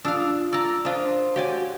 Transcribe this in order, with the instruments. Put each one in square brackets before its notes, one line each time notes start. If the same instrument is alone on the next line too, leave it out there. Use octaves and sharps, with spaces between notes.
[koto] D4 F5 [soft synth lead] F4 [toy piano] D#6 E6
[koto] D5 A#5 [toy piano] E6
[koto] D4 F4 [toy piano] A#4 F5 D#6 [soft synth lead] C5
[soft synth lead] F#4 [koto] G4 D5 G#5 [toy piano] C#5 F5